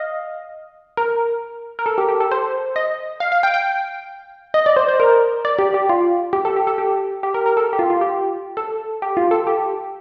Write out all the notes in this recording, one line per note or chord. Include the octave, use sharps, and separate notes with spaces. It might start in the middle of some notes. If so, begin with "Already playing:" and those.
Already playing: D#5 F5
A#4
A#4
A4
G4
G4
A4
C5
D#5
F5
F5
G5
G5
D#5
D5
C5
C5
A#4
D5
G4
G4
F4
G4
A4
G4
A4
G4
G4
A#4
A#4
A4
G4
F4
F4
G4
A4
G4
F4
A4
G4